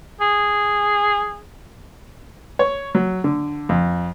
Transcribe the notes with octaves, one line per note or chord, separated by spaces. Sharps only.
G#4
C#5
F#3
D3
F2